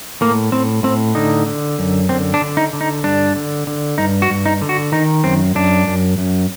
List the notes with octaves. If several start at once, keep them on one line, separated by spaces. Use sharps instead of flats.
A2 A#3
A2 C4
A2 C4
D3 D#4
D3
F#2
D3 C4
D4
D3
D#4
D3
D#4
G2 D4
D3
D3
G2 D#4
F#4
G2
D#4
D3
F#4
D#3 D#4
F#2 C4
F#2 D4
F#2
F#2